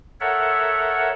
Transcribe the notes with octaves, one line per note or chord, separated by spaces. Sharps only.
A4 A#4 C#5 E5 F#5